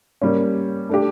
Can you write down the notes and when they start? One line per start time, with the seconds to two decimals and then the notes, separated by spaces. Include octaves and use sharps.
0.21 G3 A#3 C#4
0.89 A3 D4 G4